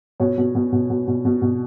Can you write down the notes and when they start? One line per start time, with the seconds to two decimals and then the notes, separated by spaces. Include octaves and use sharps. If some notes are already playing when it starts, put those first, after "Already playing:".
0.20 B2 C#5
0.38 B2
0.55 B2
0.72 B2
0.90 B2
1.07 B2
1.25 B2
1.42 B2